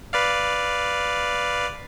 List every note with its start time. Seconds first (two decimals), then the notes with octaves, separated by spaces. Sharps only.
0.13 B4 D5 F5